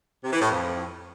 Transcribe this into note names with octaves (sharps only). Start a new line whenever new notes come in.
C3
E3
A2
F2